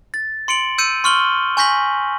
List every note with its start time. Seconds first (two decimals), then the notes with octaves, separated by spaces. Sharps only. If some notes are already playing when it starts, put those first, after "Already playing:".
0.14 A6
0.48 C6 C#7 D7 F#7
0.78 E6 G6 C#7 D#7
1.04 C6 C#6 F6 F#7 G7
1.57 G#5 C#6 G6 A#6 B6 F#7